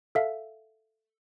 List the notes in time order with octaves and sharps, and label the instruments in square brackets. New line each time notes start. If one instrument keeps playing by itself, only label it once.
[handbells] A4 E5 F5